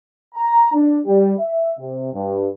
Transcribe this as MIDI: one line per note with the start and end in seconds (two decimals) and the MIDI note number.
0.35 0.71 82
0.73 1.00 62
1.06 1.34 55
1.40 1.72 76
1.79 2.11 48
2.13 2.47 43